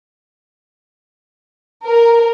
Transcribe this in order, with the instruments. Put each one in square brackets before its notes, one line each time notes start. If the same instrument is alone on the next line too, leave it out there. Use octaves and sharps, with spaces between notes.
[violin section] A#4